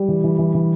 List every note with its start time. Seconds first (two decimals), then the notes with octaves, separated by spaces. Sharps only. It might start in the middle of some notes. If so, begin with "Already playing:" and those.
Already playing: G3
0.08 E3
0.24 E3
0.38 E3
0.54 E3